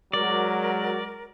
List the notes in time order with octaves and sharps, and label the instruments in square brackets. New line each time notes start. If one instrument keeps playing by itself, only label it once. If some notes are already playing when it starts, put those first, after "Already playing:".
[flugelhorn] F#3 [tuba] G#3 [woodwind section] F#4 A#4 [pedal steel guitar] D5